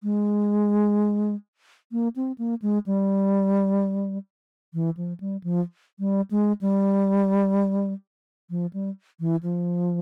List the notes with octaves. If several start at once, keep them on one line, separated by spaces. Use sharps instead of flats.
G#3
A#3
C4
A#3
G#3
G3
E3
F3
G3
F3
G3
G#3
G3
F3
G3
E3
F3